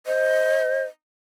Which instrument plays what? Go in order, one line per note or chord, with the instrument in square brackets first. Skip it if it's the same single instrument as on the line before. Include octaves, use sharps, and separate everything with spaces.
[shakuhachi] C5 [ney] D#5